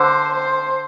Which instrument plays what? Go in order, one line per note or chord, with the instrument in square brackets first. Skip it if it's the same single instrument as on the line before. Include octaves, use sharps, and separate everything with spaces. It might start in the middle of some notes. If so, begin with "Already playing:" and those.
Already playing: [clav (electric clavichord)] D3 [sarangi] C5
[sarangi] C5